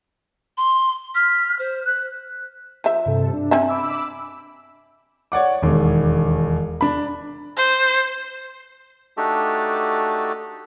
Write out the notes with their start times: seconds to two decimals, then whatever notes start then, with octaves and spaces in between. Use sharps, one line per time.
0.57 C6
1.15 F6 B6
1.59 C5
1.86 F#6
2.84 F3 E5
3.06 G2 C3 A4
3.33 D4
3.51 C4 C#4 E5
3.69 B5 D6 E6
5.32 C#5 D5 F#5 D6
5.62 E1 D#2
6.81 D4 B5
7.57 C5
9.17 A3 D4 D#4 F#4 G4 A4